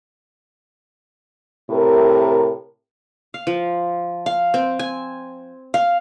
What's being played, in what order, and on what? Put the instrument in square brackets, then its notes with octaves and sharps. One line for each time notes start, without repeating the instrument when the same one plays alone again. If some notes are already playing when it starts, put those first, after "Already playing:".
[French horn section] A2 C3 A#4
[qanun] F5
F3
F5
C4
G#5
F5